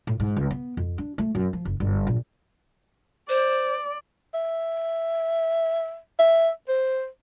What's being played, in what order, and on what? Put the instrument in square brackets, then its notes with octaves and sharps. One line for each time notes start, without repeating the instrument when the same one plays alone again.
[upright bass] A2
G#2
C#2
B3
F2
D4
A3
F#2
F3
F#1
G1
A#1
[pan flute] C5 [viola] D5
[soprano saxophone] E5
E5
C5